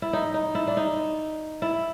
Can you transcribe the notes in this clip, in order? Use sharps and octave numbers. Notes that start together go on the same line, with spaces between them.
E4
D#4
D#4
E4
D4
D#4
E4